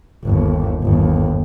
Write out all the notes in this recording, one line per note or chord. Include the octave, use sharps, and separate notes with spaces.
G1 D#2
G1 D#2